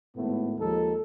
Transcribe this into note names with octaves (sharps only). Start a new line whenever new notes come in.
G#1 A2 A3 B3
D#2 F3 G#3 D#4 A4